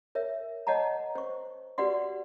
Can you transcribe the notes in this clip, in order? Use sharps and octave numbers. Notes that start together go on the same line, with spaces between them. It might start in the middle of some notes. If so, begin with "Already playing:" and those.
A#4 C#5 E5
C#5 D#5 F#5 A5 A#5
C5 C#6
F#4 G4 B4 D5 F#5 C6